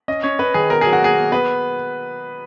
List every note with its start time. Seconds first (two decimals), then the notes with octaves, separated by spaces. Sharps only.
0.08 C#4 D#5
0.23 C#4 C#5
0.39 C#4 B4
0.54 D#3 G#4
0.70 B2 A#4
0.81 F#3 G#4
0.93 F#4
1.01 A#3 G#4
1.17 A#3
1.32 B3 B4